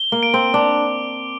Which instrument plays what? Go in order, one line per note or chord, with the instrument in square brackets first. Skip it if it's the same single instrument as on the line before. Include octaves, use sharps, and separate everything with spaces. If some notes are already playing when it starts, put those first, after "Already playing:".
Already playing: [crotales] G7
[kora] A#3
[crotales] D7
[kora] C4
[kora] D4 [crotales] D6